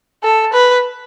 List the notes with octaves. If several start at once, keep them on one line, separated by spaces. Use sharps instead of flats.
A4
B4